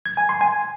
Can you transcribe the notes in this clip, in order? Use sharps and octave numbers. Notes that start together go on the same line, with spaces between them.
G#6
G#5
C6
G#5